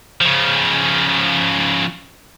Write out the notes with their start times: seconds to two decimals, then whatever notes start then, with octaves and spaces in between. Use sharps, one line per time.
0.21 C#3 F3